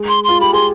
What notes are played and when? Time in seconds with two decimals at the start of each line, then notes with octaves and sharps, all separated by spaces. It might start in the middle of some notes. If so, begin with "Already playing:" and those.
Already playing: G#3
0.08 C6
0.24 F4 C6
0.40 G4 B5
0.53 G#4 C6